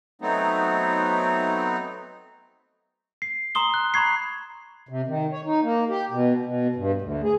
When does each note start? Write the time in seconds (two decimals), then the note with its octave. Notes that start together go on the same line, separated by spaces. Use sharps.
0.22 F#3 A3 B3 C4 D#4
3.22 C7
3.55 A#5 C6 D#6 G7
3.74 F#6
3.94 A#5 B5 C#6 G#6 C7
4.89 C3
5.07 D#3
5.32 C#5
5.45 D#4
5.63 A#3
5.89 G4
6.11 B2
6.45 B2
6.76 G2
7.02 D2
7.24 G#4